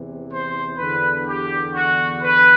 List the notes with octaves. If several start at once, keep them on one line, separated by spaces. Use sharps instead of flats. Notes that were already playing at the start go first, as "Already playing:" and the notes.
Already playing: E2 C3 E3
C5
E2 D3 B4
G4
F#4
B4